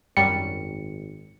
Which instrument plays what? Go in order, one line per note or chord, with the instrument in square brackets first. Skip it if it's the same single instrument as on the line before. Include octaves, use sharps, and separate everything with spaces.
[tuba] G#1 [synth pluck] F#2 G3 [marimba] G5 [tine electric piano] C#7